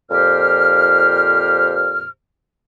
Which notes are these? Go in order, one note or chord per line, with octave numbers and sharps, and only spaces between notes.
F2 A#2 G4 C5 F6